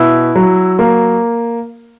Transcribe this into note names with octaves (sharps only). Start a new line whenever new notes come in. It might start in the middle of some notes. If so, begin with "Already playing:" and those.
Already playing: B2 E4
F#3
A#3